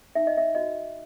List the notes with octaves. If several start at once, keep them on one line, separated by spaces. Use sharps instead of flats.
D#4 E5
D#5
E5
F#4 D#5